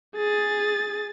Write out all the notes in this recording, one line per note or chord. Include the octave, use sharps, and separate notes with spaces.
G#4 A6